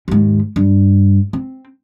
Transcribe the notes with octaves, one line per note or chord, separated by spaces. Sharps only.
D#2 G#2
G2
C4